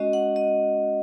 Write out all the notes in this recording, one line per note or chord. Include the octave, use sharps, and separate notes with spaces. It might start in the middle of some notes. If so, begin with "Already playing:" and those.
Already playing: G#3 C#4 F#4 D#5
F#5
D#5